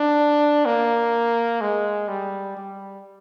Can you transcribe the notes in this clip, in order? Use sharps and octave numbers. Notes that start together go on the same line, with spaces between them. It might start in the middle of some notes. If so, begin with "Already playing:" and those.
Already playing: D4
A#3
G#3
G3
G3